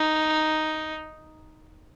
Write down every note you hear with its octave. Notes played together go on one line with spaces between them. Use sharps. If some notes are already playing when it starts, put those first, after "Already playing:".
Already playing: D#4